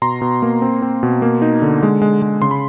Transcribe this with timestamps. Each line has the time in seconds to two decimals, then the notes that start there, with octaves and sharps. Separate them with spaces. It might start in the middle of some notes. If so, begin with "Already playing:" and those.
0.02 B2 A#5 C6
0.21 B2
0.42 A#3
0.62 C4
0.82 C4
1.03 B2
1.22 A#3
1.42 D#4
1.62 D3
1.83 G#3
2.02 G#3
2.22 G#3
2.42 C#3 C6
2.51 B5